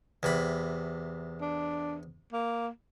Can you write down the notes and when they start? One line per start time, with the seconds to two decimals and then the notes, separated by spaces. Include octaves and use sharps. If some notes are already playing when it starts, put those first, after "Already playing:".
0.23 E2 C3 B5
1.41 D4
2.32 A#3